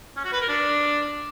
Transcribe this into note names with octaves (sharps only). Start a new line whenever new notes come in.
C#4
F#4
B4
A#4
D4